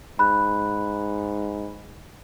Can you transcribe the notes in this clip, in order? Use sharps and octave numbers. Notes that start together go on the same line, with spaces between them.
G#2 B5 F#6